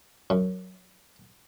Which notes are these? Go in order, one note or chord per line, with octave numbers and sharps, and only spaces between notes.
F#2